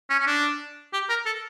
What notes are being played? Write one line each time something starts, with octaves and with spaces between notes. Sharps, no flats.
C#4
C#4
D4
G4
A#4
A4